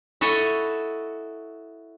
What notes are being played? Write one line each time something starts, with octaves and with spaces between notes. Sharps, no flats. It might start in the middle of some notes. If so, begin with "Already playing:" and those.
E4 F#4 A4 C#5 D#5